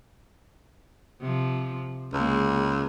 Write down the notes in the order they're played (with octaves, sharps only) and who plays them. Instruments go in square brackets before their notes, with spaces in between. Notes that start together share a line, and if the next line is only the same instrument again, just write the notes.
[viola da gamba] C3 F3
[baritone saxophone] C#2 [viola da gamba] G#3 A#3